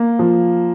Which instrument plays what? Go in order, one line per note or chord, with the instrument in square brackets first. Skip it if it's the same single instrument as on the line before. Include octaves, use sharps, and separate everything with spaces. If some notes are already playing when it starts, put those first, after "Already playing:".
Already playing: [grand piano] A#3
F3